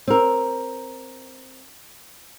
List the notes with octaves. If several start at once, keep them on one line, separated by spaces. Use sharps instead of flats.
C4 A#4